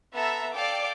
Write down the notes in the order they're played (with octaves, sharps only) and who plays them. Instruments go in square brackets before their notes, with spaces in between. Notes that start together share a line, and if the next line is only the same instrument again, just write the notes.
[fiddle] B3 A4 [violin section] E5 A#5
[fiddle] A4 F5 [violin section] D5 G5 D6